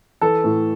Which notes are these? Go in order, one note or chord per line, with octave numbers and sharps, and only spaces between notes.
E3 A4
A2